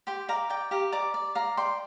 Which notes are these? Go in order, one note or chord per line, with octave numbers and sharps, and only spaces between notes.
G4 G5 C6
D5 F5 A#5
D5 G5
G4 F5 A#5
D5 A#5 D6
D5
D5 F5 A#5
D5 G5 C6